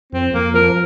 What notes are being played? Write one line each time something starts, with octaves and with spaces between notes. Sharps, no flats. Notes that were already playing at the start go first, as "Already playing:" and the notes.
F2 C4
F2 A#3
F3 A#4